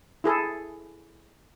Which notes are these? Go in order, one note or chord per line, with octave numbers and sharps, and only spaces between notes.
E4 G#4 A4